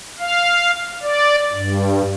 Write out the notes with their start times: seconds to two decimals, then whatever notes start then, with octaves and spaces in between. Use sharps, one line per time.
0.19 F5
1.02 D5
1.53 G2